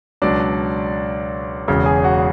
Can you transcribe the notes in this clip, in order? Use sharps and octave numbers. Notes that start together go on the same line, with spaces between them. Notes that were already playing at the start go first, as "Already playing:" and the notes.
C#2 B2 F#3 D4 D5
E1 E2 C#3 F#3
G#4 G#5
F#4 F#5